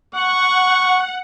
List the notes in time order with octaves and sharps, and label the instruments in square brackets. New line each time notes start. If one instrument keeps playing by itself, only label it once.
[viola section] F#5 [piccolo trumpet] C#6